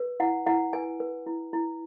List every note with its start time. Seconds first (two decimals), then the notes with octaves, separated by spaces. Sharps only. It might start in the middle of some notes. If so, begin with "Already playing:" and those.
Already playing: B4
0.20 E4 F#5
0.46 E4 F#5
0.73 B4 G#5
1.00 B4
1.26 E4
1.53 E4